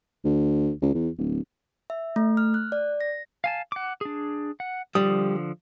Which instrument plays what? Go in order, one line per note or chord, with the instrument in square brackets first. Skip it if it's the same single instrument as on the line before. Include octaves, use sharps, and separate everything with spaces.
[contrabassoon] D2
C#2
E2
D1
[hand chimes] E5
A3
F6
F#6
D5
A#6
[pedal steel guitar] F5 G#5 A5
F#5 D6
D4 G#4
F#5
[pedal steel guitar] D3 F3 D#6 [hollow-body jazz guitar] G3